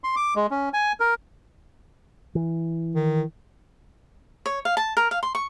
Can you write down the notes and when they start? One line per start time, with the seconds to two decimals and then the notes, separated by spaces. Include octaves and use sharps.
0.04 C6
0.16 D6
0.36 G#3
0.51 C#4
0.74 G#5
1.00 A#4
2.35 E3
2.95 D#3
4.46 C#5
4.65 F5
4.77 A5
4.97 A#4
5.11 F5
5.23 C6
5.35 C#6